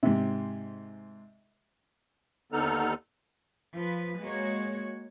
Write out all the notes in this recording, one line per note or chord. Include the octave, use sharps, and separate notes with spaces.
G#2 C3
D#2 D3 B3 D#4 A4 F6
F3 B4
G#3 A#3 F#4 C#5